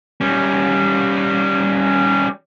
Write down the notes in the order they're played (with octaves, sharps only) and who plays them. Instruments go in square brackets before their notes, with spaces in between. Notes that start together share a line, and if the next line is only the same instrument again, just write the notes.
[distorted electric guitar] G3 C#4